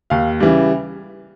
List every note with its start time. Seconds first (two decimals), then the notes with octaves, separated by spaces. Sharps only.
0.10 D#2 F5
0.40 C#3 E3 G3